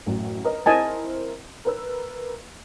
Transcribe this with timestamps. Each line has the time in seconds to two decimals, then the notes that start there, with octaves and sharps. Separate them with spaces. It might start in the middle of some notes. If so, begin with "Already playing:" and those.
0.06 A1 F#2
0.44 A#4 B4 D#5
0.66 C4 E4 A#4 D#5 G#5 A5
1.65 A#4 B4 E6